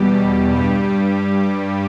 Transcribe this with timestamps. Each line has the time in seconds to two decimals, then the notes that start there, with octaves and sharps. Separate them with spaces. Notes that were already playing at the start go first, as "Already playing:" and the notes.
Already playing: E2 B2 G3 G4
0.54 G2 G3